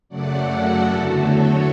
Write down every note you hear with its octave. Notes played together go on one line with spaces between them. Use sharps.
F#2 C#3 F#3 A3 D5 F#5
F#4 A4
E2 D3 F#3 A3 F#4 A4
A4 C#5